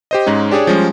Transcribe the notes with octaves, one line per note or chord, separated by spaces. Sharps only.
G4 C5 D#5
G#2 G#3 C#4 D#4
D4 G4 G#4 C#5 D5
F3 G3 G#3 C#4